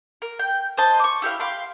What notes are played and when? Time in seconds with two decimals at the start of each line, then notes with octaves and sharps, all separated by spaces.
0.22 A#4
0.39 G5
0.77 C5 D#5 A5
1.00 C#6 D6
1.22 E4 G4 A4 F5
1.40 F5 G5 B5 C6